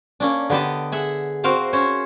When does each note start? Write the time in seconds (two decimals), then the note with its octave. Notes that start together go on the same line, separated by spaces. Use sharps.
0.20 A#3 C#4 D4
0.50 D3 B3 G4 D#5 A5
0.92 G#4 E5 F#5
1.44 C4 F#4 A#4 C5 F5 A#5
1.73 C#4 C5 C#5